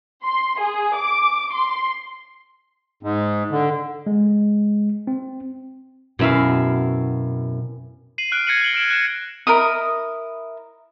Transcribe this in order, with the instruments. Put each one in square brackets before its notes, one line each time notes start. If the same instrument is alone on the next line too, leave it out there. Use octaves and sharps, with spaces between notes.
[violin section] C6
G#4
D6
C6
[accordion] G#2
D3
[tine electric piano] G#3
C4
[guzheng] F#2 E5 F5 [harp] B2 C4 E4
[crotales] C7 D#7 F#7
F6 F#6 D7 D#7
F#6 G#6 A#6 C#7 D#7 F#7
F#6 D7 F#7 G7
F6 D7 E7 F#7
F#6 A#6 E7
[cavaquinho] E4 A#4 D#5 D#6